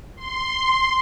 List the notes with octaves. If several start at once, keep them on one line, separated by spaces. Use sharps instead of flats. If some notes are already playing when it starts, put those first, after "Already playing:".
C6